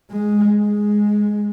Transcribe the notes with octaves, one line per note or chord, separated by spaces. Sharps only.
G#3
G#3